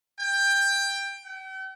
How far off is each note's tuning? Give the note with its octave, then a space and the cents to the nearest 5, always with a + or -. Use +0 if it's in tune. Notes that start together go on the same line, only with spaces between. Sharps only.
G5 +15
G5 -45